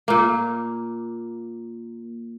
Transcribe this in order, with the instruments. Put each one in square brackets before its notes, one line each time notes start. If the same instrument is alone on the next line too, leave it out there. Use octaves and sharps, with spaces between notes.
[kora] A#2 A#3